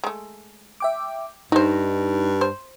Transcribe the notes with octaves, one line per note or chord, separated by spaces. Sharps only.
G#3 A3
E5 G5 D6
G2 A3 D#4 C5
C5